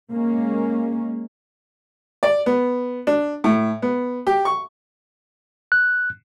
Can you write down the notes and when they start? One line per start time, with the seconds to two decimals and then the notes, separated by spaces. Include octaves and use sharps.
0.13 G#3 A#3 C#4
2.23 D5
2.46 B3
3.07 D4
3.44 A2
3.82 B3
4.27 G4
4.45 C#6
5.72 F#6